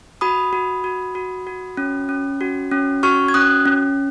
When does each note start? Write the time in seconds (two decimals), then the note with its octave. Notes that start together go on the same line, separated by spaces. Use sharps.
0.21 F#4 B5 D#6
0.53 F#4
0.84 F#4
1.15 F#4
1.47 F#4
1.77 C#4
2.09 C#4
2.41 F#4
2.71 C#4
3.03 F#4 C#6 F6
3.28 G#6
3.34 C#4 D#6 F#6
3.66 C#4